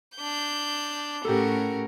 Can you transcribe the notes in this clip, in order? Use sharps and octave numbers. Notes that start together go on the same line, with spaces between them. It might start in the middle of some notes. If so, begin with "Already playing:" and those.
D4 G6
A2 C#4 F#4 G4 A4 A#4